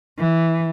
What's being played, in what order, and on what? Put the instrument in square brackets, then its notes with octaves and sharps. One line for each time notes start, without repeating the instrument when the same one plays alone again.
[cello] E3